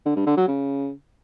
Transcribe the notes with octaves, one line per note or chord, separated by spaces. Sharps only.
D3
G2
D3
F#3
C#3